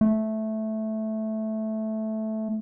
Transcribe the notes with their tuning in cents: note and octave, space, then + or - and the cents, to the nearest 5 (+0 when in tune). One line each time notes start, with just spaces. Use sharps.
A3 -10